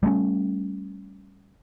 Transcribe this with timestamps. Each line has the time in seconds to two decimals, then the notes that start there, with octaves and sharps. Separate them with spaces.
0.03 G3 A3 A#3 C#4